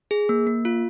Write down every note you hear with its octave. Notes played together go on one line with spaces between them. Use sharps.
G#4
A#3
A#3
F4